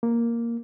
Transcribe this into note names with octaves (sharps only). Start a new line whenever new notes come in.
A#3